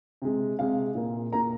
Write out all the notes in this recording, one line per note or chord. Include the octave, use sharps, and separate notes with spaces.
C3 G#3
C3 G#3 F5
A#2 A#3
A#2 A#3 A#5